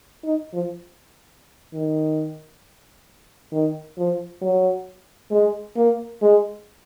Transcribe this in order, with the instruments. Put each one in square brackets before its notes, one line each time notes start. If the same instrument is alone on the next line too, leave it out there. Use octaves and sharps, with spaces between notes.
[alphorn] D#4
F3
D#3
D#3
F3
F#3
G#3
A#3
G#3